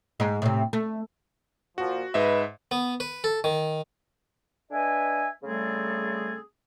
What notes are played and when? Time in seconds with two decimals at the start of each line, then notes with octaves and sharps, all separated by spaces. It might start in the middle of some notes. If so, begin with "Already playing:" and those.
0.20 G#2
0.42 A2 C3
0.73 A3
1.78 A#2 F3 F#4
2.14 G#2 B4 D#5 E5
2.71 B3
3.00 B4
3.24 A4
3.44 D#3
4.71 D4 B4 D#5 E5 G#5
5.43 C#3 G3 A3 C4 G#4 A4